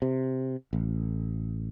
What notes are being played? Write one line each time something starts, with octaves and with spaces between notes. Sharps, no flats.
C3
A1